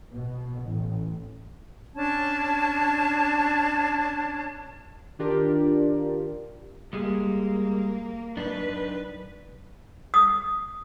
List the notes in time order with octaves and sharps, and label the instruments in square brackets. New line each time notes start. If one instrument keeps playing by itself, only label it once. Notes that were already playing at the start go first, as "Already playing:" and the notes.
[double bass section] B2
A1
[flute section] C#4 D4 A5 G#6
[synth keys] D#3 D4 F4 G4 A#4 D5
[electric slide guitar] G3 G#3 [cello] A#3
[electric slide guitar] F#2 D4 D#4 [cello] B4
[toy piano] D#6